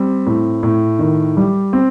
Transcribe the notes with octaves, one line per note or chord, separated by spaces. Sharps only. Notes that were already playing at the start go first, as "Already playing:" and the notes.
Already playing: G3 C4
A2
A2
D#3
G3
C4